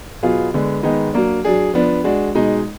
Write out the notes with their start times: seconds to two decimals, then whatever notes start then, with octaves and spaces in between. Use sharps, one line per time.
0.23 B2 F#3 B3 F4 G#4
0.54 D3 G#3 B3
0.83 D#3 G#3 B3 D#4
1.14 F#3 A#3 D4
1.45 F#3 D4 G#4
1.74 F3 B3 D4
2.04 G#3 D4 F#4
2.35 B2 G#3 D#4